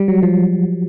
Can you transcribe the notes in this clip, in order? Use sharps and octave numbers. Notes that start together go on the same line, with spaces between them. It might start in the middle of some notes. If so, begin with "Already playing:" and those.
Already playing: G3
F#3
F3